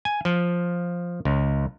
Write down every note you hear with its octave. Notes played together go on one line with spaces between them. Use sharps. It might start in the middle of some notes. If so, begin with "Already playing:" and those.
G#5
F3
C#2